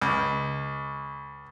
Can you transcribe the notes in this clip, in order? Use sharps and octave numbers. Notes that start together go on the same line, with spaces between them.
C#2